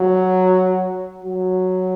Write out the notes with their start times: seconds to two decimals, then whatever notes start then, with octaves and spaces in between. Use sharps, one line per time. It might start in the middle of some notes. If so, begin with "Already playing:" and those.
Already playing: F#3
1.24 F#3